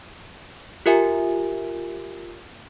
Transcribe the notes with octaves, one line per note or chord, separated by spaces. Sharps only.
F4 G4 A#4 E5 G#5